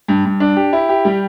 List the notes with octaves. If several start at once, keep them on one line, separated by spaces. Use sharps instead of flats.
G2
G2
D4
G4
E4
G4
G3